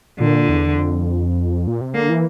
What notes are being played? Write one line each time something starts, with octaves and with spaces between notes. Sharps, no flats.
A#2 D3
E2
F2
A#2
C3
D3 A#3
E3